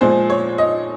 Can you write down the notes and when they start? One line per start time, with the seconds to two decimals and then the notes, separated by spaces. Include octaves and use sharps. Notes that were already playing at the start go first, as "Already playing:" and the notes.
0.01 A#2 F3 G#3 C5
0.30 C#5
0.58 D#5